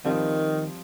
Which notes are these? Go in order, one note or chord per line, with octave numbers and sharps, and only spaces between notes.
D#3 F3 G3 C4